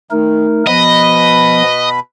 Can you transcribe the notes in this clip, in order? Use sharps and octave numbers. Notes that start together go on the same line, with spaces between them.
D#3 A3 D#4 A#4
B2 F3 B3 B4 D#5 B5